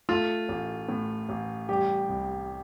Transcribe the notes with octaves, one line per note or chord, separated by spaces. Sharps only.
A3 F4
A1
A2
A1
G3 G4
C2